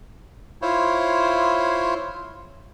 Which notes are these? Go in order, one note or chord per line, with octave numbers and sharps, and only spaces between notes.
E4 F4 C5 C#5